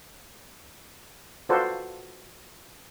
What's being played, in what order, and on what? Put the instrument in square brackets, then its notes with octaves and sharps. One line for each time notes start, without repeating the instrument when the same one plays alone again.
[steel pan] F4 F#4 A4 B4 C5 D5